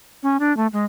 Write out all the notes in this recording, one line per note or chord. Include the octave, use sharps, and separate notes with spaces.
C#4
D4
A3
G#3